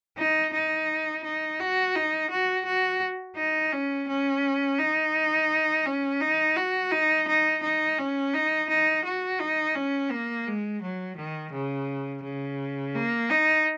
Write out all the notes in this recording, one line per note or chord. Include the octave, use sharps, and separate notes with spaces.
D#4
D#4
D#4
F#4
D#4
F#4
F#4
D#4
C#4
C#4
D#4
C#4
D#4
F#4
D#4
D#4
D#4
C#4
D#4
D#4
F#4
D#4
C#4
A#3
G#3
F#3
D#3
C#3
C#3
A#3
D#4